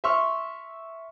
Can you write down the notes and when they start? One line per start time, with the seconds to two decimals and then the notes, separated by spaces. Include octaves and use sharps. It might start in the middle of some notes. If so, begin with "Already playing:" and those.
0.04 E5 C6 C#6 E6 F6